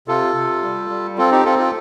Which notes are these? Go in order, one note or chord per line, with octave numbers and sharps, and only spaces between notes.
C3 F4 A4
C3
G3
G3
C4 F4 A4
D#4 G4
C4 F4 A4
F4 A4